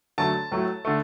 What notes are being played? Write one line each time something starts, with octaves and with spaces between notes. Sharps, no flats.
D3 F#3 A3 A5
A2 F#3 A3
D3 A3